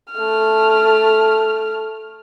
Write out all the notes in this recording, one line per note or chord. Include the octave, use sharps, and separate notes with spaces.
A3 F6